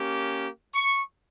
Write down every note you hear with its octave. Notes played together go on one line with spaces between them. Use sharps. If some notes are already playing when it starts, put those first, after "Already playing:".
Already playing: A#3 C#4 G4
C#6